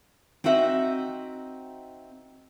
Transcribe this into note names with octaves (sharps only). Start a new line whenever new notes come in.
C4 D#4 F#4 E5 F#5